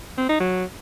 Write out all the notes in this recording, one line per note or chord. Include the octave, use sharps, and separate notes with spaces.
C4
D#4
F#3